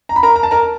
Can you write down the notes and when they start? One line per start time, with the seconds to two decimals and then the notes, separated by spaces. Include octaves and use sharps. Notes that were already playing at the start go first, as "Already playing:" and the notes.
0.09 A#5
0.16 B5
0.23 A#4 A#5
0.36 A#5
0.43 A5
0.51 A#4 A#5